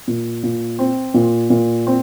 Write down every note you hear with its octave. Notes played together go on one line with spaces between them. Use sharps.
A#2
A#2
C4
A#2
A#2
C4